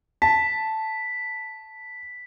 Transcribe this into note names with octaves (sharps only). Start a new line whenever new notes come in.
A5 B6